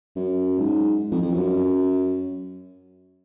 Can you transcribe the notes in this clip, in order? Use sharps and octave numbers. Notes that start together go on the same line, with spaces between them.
F#2
G#2
F2
F2
F#2